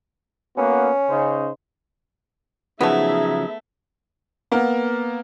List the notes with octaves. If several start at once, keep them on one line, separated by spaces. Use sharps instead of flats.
A#3 B3 C#4 F#4
C#3 D#4 C5
C#3 F3 F#3 A3 B3 D#4 G#4 E5
A#3 B3 A#4